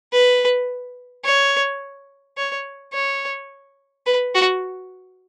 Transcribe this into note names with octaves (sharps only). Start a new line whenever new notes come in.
B4
C#5
C#5
C#5
B4
F#4